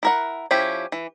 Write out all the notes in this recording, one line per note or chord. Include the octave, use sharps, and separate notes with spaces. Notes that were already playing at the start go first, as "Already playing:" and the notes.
E4 A#4 F#5
F3 C#4 E4 G4
E3